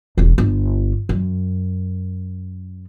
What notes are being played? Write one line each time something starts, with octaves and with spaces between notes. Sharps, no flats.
E1 E2
G1
F#2